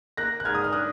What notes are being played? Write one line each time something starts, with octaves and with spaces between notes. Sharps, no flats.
A#3 F#6 A#6
F#6
G#2 F6 G#6
D#6
F6
D4 D#6 F#6